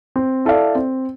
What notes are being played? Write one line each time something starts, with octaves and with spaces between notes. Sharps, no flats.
C4
E4 A4 D5 F5
C4